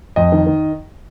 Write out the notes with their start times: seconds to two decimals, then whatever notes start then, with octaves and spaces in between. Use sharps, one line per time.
0.16 F2 D#5
0.32 D#3
0.46 D#3